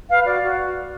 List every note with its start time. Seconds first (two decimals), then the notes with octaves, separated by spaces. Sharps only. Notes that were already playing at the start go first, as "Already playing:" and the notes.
0.09 B4 F5
0.25 F#4 D5
0.42 F#4